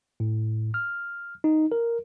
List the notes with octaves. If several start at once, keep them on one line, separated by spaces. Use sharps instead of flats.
A2
F6
D#4
A#4